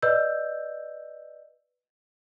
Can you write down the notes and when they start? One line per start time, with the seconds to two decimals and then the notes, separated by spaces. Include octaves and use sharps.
0.02 B4 D5 D#5 E6 G6